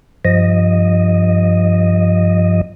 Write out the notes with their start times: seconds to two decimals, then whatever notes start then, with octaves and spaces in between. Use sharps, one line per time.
0.25 G2 F3 D#5